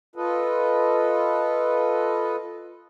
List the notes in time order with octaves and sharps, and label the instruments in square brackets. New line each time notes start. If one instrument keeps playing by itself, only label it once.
[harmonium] F4 A4 B4 D#5